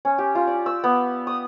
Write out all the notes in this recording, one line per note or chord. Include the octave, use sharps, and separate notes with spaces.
C#4
G4
F4
D5
E6
B3
D#6